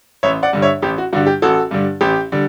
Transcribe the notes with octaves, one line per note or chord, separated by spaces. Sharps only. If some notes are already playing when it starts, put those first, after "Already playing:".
A1 C#5 E5
D5 F#5
G2 D3 G3
C#5 E5
A1 G4
F#4
G2 D3 G3 F#4
G4
A1 F#4 A4
G2 D3 G3
A1 G4
D3 G3